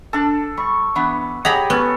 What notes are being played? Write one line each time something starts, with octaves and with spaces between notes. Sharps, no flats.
D4 A4 A5
G3 C#6
E3 B3 D4
G4 G#4 C#5 D#5 F#5 A#5 B5
B3 C#4 A4